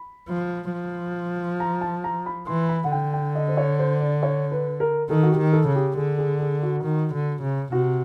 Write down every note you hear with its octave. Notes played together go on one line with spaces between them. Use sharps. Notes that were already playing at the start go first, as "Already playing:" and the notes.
Already playing: B5
F3
F3
A#5
A5
A#5
B5
E3 C6
B5
F#5
D3 G5
G5
D#5
C5
C#5
C5
D5
C#5
B4
A#4
D#3 A4
F#4
G4
D#3
A4
C#3
G4
D3 G#4
G#4
G#4
F#4
D#3
D3
C#3
C3 F#4